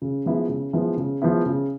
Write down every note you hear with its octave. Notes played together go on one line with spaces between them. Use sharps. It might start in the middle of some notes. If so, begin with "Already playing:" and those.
C#3
F3 G#3 B3 E4
C#3
F3 G#3 B3 E4
C#3
F3 G#3 B3 E4
C#3